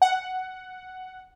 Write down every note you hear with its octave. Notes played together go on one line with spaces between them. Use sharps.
F#5